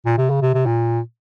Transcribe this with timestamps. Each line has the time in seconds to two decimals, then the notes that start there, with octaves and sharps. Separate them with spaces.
0.05 A#2
0.18 C3
0.30 C#3
0.42 C3
0.54 C3
0.66 A#2